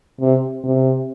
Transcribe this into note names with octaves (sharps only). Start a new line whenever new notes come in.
C3
C3